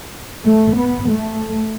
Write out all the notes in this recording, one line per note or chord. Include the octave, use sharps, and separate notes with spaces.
A3
B3
A3